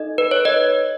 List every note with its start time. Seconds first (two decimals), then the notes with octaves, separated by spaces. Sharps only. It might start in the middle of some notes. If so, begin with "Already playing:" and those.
Already playing: D#4 A4 D#5
0.18 B4
0.31 C#5
0.45 B4 D#5